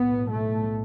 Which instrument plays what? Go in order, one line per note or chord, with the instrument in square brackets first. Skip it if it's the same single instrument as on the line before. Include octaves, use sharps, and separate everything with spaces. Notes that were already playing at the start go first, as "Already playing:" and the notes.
Already playing: [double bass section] B1 A2 B3
A3